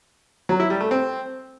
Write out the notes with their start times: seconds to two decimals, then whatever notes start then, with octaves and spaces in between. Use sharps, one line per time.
0.49 F#3
0.60 E4
0.70 G3
0.81 A3
0.91 C4